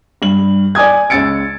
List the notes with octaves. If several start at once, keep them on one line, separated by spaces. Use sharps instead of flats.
G2 F#7
D5 G#5 D#6 G#6
C#2 E6 A6 C#7 D7